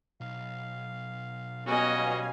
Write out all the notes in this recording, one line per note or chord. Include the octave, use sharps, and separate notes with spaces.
B1 F5
B2 G3 B3 C#4 F#4 D#5 F5 G#5